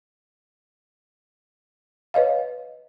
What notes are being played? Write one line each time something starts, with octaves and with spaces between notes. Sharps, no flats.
B4 C#5 D#5 F5